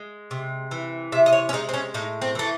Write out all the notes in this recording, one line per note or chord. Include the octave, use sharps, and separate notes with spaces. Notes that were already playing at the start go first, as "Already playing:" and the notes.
Already playing: G#3
C3
E3
C3 E5
D#5
C#5
C#4
G#3 D#4
C4
C#4
A2 D#4
C4
E3 A3